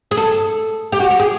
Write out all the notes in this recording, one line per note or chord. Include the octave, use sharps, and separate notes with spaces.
G#4
A4
G4
F#4
G4
G#4